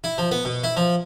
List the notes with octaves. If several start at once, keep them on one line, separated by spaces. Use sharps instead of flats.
E4
F3
B3
B2
E4
F3